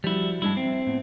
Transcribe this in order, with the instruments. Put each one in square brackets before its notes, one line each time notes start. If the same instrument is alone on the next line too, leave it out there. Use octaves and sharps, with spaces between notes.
[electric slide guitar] F3 F#4 [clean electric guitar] G3 E4
[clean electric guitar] G2 G#3 E4 [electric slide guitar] G3 D4 A5
[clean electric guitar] C4 [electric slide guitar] E5
[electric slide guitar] A2 B3